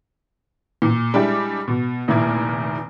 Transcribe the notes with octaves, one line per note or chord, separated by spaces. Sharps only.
A#2
G3 G#3 D4 E4 G4
B2
F1 A#2 D#3 E4 G#6